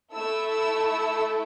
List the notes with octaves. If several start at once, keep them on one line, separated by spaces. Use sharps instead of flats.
A3 E4 A4 E6
E6
E6